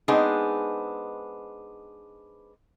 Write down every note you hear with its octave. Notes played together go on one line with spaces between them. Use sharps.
G#3 B3 C4 D4 D#4 G#4